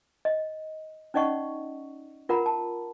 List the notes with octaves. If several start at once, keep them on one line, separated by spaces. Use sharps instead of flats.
D#5
C#4 D#4 D5 D#5 F#5 C#6
F4 A#4 F#5 A#5 B5
A5